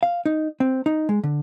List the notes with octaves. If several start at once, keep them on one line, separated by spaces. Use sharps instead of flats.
F5
D#4
C4
D#4
G#3
D3